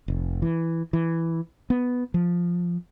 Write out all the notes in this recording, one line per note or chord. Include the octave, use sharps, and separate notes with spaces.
F1
E3
E3
B3
F3